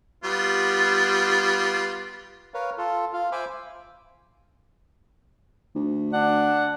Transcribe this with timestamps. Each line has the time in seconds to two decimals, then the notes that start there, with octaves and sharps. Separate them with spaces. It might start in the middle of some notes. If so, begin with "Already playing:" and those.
0.24 G3 B3 F4
2.54 A#4 B4 C#5 F5
2.78 F4 A4
3.13 F4 F5
3.32 C5 E5 G#5 B5 D6
5.75 D2
6.13 D4 F#5